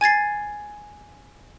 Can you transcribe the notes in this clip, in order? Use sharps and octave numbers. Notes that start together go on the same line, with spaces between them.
G#5 G#6 A6 C7